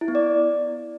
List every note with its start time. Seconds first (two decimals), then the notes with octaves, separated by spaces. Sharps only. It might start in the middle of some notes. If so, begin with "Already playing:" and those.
0.01 E4
0.08 B3
0.15 D5